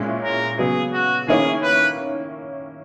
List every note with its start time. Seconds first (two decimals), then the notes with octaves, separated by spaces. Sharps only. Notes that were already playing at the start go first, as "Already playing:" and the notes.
Already playing: A#2 G#3 C#4 E4
0.24 A#4
0.58 C#3 F#3 B3 G#4
0.93 F#4
1.28 D#3 A#3 C#4 E4 G#4
1.62 B4